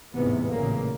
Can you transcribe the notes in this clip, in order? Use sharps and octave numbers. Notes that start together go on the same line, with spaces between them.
A1 E2 G#2 C3 B3
A1 A#2 C#3 A#3